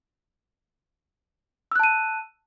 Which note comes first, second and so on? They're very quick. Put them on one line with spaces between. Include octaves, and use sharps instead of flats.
E6 F#6 A5 D#7